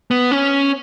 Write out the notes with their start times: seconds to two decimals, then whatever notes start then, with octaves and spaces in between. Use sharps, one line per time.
0.11 B3
0.31 C#4